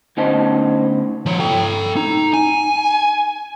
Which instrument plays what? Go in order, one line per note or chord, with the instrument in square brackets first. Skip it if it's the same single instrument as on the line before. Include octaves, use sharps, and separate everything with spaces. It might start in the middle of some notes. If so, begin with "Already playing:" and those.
[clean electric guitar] D2 B3 C#4 D#4 C5 A5
[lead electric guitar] F3 C#5
A4 G5
D#4
G#5